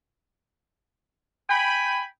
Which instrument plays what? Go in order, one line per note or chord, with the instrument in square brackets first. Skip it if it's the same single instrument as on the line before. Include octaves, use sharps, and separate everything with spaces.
[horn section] G5 G#5 B5